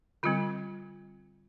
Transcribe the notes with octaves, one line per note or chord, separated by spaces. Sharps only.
D3 G3 C4 F4